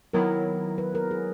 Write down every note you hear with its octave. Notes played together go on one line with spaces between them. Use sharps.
D#3 F#3 B3 E4 A#4
B4
A#4
G#4